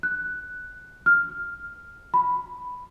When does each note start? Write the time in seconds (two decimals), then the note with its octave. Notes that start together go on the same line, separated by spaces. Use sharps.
0.03 F#6
1.06 F6
2.14 B5